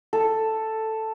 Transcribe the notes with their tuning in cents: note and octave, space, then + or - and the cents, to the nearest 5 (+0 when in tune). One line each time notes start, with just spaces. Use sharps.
A4 +5